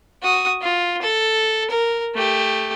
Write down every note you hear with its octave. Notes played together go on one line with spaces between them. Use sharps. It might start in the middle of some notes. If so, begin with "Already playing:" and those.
F#4 D#6
F4
A4
A#4
A3 G4